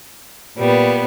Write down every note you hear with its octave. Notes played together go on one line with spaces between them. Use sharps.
A#2 G3 B3